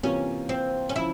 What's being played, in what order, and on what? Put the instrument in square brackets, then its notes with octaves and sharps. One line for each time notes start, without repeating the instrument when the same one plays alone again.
[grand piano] C3 E3 A#3 F4 [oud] C#4
[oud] C4
C#4
[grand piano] C#3 F3 [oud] E4